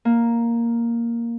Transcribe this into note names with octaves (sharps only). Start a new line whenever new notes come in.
A#3